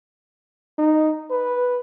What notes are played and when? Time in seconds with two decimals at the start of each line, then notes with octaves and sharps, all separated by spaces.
0.78 D#4
1.31 B4